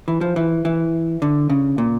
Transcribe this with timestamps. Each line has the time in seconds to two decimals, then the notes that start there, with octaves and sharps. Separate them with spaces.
0.08 E3
0.21 F3
0.36 E3
0.65 E3
1.22 D3
1.50 C#3
1.78 A#2